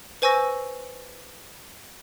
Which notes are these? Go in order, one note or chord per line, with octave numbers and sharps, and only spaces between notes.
B4 C5 G#5 C#6 E6 A#6